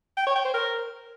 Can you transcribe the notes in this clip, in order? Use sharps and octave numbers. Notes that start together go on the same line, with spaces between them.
G5
C#5
G5
C5
A#4